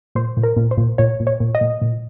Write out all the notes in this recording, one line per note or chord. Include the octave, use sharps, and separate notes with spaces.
A#2 C5
A#2
A#4
A#2
C5
A#2
A#2 C#5
A#2
C#5
A#2
D#5
A#2
A#2